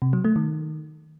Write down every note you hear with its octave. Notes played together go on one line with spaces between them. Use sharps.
C3
F#3
A3
D#3